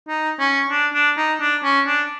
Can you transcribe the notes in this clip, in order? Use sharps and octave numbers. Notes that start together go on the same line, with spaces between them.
D#4
C#4
D4
D4
D#4
D4
C#4
D4